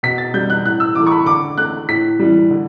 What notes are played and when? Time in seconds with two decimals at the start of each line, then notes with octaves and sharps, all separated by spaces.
0.03 B2 B6
0.18 A6
0.34 G3 G6
0.50 F#6
0.65 A2 F#6
0.80 E6
0.95 E3 A3 D6
1.07 C#6
1.12 B5
1.26 D3 D6
1.57 A3 F#6
1.89 A2 B6
2.19 E3 G3
2.50 D3